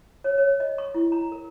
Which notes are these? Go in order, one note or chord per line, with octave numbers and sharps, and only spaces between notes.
C#5
C#5
D#5
C#6
E4
A#5
A#4